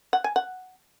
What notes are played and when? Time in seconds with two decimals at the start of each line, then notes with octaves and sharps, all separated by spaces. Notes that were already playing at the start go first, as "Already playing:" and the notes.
0.13 F#5
0.24 G#5
0.36 F#5